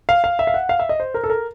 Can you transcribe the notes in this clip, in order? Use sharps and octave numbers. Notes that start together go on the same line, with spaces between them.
F5
F5
E5
F5
F#5
F5
E5
D#5
C5
A#4
A4
A#4